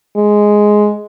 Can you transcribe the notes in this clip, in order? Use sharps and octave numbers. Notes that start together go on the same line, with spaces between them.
G#3